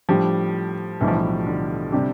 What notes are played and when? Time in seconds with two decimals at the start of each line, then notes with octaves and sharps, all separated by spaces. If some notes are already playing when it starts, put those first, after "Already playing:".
0.09 A2 F3 G3 D4 G4
1.01 B1 A2 E3 G3 D4 G4
1.08 F3
1.15 E3
1.46 D3
1.92 C3 G3 D4 G4